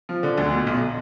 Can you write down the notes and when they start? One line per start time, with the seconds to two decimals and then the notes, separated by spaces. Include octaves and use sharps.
0.09 F3
0.23 D3
0.38 D2
0.52 B2
0.67 B1